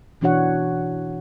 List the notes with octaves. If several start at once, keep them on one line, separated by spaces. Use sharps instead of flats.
B2 E3 D4 F#4 C#5 F#5